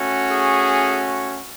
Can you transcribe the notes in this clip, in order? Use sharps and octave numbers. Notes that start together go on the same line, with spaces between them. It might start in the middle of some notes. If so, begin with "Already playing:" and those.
Already playing: A3 C#4 F#4
G#4